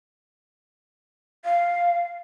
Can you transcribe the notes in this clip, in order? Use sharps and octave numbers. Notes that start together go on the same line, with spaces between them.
F5